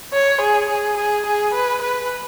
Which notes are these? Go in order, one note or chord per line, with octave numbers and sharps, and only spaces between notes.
C#5
G#4
G#4
G#4
G#4
B4
B4